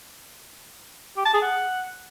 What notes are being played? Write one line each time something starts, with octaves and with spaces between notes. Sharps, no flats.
G4
A5
G#4
F#5